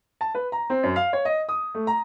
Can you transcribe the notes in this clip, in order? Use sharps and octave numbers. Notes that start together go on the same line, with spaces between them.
A5
B4
A#5
C4
F#2
F5
C#5
D#5
D#6
A3
A#5